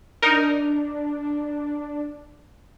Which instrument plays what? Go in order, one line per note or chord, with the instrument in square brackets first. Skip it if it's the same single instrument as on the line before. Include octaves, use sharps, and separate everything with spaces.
[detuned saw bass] D4 [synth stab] D#4 A#4